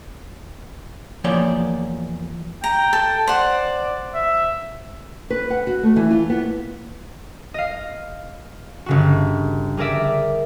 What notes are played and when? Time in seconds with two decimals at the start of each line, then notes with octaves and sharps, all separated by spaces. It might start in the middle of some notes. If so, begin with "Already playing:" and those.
1.24 E2 F3 A#3 C#5 D5 G5
2.64 G5 A#5
2.93 A4
3.27 C5 D5 F#5
4.15 E5
5.30 B4
5.50 F#5
5.67 F#4
5.83 A3
5.96 E3
6.11 F4
6.30 B3
7.54 D#5 F5
8.86 G1 C#3 F#4
9.77 G3 G#4 A#4 D5 E5